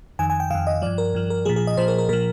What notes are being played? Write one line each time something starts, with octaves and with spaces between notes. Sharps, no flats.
F2 D#3 G#5
G#5
G5
F2 D#3 F5
D#5
G2 F3 D5
A#4
G2 F3
A#4
A#2 F3 G#4
G#4
D#5
A#2 F3 C5
A#4
A#4
A#2 F3 A#4